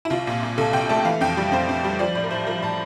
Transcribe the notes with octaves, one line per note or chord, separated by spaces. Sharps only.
E4
C2 F4
A#2
A#2
C2 A4
C2 G5
A3 A5
E3 F5
F2 G5
G3
F2 C5
F2
G3
F3 D5
A2 D5
A#4
A2 C5
F3 A#4
A2 A5